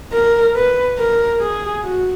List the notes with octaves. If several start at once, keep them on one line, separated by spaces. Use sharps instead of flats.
A#4
B4
A#4
G#4
F#4